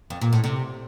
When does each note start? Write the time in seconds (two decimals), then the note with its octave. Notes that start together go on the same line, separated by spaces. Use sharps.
0.10 F2
0.21 A#2
0.33 A2
0.44 C3